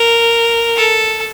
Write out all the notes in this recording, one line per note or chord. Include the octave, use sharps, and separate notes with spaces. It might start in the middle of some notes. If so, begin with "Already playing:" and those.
Already playing: A#4
A4